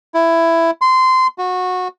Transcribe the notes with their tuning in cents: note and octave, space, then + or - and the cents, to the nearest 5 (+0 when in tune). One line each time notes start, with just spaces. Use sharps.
E4 +10
C6 -20
F#4 -20